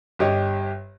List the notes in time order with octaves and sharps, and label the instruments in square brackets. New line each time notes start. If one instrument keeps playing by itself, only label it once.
[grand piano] G1 G4 C#5 D#5